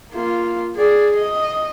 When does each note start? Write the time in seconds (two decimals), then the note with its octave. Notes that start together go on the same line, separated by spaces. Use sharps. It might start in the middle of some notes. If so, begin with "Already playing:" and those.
0.13 A#3 F4
0.76 G#4 D5
1.16 D#5